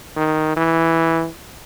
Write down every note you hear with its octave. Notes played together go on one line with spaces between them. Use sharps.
D#3
E3